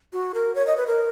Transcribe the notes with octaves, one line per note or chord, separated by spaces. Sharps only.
F#4
A#4
C#5
D#5
B4
A#4